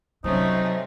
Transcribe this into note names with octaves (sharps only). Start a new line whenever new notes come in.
C3 F#3 A3 C#4 D#4 C5